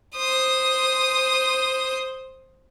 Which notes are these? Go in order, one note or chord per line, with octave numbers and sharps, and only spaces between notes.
C5 D#6